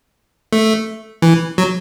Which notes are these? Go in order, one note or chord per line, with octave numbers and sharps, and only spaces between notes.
A3
E3
F#3